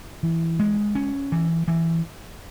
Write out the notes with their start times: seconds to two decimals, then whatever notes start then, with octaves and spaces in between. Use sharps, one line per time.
0.23 E3
0.59 G#3
0.95 C#4
1.32 E3
1.68 E3